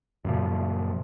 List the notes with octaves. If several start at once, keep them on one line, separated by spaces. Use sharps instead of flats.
F#2 A#2 C#3 F3